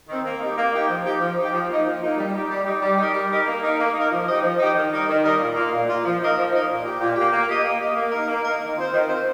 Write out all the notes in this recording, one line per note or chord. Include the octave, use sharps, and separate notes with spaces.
D#3 C4
A#3
D#4 G4
A#3
D#4 G4
F3
D#4 G4
F3
D#4 G4
F3
A#3 D#4
F3
A#3 D#4
G3
D#4 G4
G3
D#4 G4
G3
D#4 G4 A#4 D#5
G3
D#4 G4 A#4 D#5
A#3
D#4 A#4
A#3
D#4
A#4
F3
D#4 G4 D#5
F3
D#4 G4 D#5
D#3
G3 D#4 A#4 D#5
D#3
G3 D#4 A#4 D#5
A#2
A#3 F4
A#2
A#3 F4
F3
D#4 A#4 D#5
F3
D#4 A#4 D#5
A#2
A#3 G4
A#2
A#3 G4
A#3
G4 D#5
A#3
G4 D#5
A#3
D#4 A#4
A#3
D#4 A#4
D#3
C4 F4 C5
D#3
C4 F4 C5